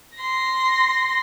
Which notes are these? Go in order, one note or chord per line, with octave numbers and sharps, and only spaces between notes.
C6 A#6